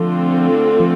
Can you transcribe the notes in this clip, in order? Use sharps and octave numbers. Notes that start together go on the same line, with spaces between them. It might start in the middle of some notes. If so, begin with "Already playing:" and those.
Already playing: D3 F3 A3 C4 F4 A4
F3